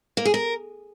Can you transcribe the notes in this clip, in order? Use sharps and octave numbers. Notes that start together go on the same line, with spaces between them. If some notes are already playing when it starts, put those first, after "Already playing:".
A#3
G#4
A#4